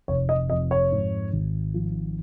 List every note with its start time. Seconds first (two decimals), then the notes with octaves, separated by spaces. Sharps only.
0.08 F1 C#5
0.29 D#5
0.50 F2 D#5
0.71 C#5
0.92 G#2
1.33 G#1
1.74 F3